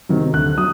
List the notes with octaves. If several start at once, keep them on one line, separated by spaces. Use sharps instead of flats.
C3 D#3 F#3
D2 F#6
F#3 D#6